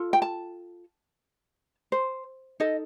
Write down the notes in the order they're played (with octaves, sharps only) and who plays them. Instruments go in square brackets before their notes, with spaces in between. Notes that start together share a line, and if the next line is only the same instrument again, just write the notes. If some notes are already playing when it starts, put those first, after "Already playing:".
Already playing: [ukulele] F4 A4
G5
A5
C5
D#4 A4 D#5